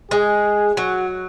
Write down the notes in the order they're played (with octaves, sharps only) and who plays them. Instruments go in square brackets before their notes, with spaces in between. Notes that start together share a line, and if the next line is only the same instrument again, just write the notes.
[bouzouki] G#3 [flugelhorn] G#4
[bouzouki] F#3 [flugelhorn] F#4